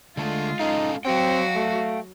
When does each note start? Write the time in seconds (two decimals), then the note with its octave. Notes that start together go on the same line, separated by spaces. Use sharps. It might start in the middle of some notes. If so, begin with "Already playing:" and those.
0.17 D3 G#3 A3 F4
0.59 C#4 D#4 A4 F5
1.05 F#3 C4 F#4 F5 G5
1.55 A3